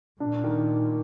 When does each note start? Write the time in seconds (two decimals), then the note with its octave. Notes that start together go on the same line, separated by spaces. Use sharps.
0.20 A#2 D4
0.44 D#3